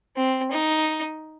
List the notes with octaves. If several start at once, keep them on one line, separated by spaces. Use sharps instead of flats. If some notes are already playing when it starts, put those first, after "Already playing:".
C4
D#4